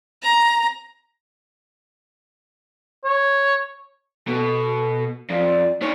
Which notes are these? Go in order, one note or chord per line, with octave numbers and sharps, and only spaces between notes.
A#5
C#5
B2 A4
F2 D5
D4 D#4 C#5